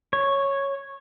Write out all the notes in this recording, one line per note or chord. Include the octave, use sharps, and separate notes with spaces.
C#5